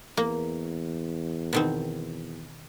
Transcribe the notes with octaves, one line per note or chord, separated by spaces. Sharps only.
E2 A#3
B2 D#3 C4